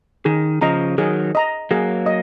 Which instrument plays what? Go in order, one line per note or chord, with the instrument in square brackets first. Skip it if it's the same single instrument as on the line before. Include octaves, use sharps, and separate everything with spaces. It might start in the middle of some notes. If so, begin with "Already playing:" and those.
[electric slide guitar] D#3 [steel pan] G#4
[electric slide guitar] C#3 F3 [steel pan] D#5 A#5
[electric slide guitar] D#3 F#3 [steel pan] G#4
[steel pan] D#5 A#5
[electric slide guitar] F#3 A#3 [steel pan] G#4
[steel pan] D#5